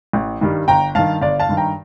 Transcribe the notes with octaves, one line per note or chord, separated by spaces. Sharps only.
A1
G2 D#3 G3
G1 G5 A#5
G2 D#3 F5 A5
G1 D5 F5
F5 A5
G2 D#3
G5 A#5